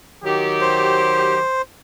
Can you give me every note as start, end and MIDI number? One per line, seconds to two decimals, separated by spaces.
0.24 1.40 51
0.24 1.40 54
0.24 1.40 67
0.61 1.62 72